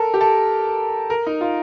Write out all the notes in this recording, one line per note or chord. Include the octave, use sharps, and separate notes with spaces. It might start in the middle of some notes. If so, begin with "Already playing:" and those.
Already playing: A4 A#4
G4
A4
A#4
D#4
F4